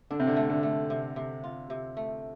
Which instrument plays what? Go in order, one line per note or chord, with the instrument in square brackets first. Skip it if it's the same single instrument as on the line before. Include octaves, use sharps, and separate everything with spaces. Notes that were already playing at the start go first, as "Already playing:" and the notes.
[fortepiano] D3 [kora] D4
[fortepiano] C3
D3
[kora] A3
[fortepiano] D3
[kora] A3
C3
C3
F4
C3
A3